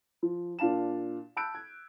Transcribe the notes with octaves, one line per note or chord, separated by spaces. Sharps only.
F3
A#2 D4 F5 A5 E7
A5 B5 E6 F#6 G6 D7
G#6